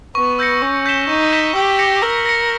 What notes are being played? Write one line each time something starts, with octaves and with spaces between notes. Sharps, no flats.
B3 C#6
E6 G6 A#6 C#7
C#4 C#6
G6 B6 E7 G7
D#4 C#6
G6 B6 E7 G7
G4 E6
A#6 C#7
A#4 E6
A#6 C#7